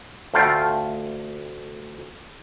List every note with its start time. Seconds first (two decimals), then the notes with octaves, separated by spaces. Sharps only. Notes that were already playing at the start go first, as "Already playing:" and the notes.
0.34 D2 A3 F4 G5